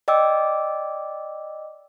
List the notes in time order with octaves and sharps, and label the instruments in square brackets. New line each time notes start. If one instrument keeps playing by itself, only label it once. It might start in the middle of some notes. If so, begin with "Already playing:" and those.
[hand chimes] D5 D#5 G5 D6 E6